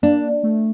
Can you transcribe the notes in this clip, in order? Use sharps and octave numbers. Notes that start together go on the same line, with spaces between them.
A#3 D4
A3